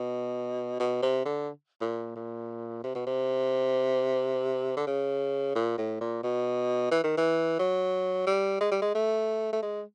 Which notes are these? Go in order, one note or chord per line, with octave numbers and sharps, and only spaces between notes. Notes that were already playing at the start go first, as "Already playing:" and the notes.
Already playing: B2
B2
C3
D3
A#2
A#2
C3
B2
C3
D3
C#3
A#2
A2
A#2
B2
E3
D#3
E3
F#3
G3
G#3
G3
G#3
A3
A3
G#3